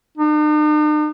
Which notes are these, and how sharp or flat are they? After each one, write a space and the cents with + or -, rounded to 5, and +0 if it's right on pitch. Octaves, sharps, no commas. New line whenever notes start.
D#4 -45